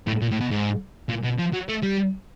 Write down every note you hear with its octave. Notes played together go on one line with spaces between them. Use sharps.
A2
A#2
A2
B2
G#2
A#2
B2
F3
F#3
A3
G3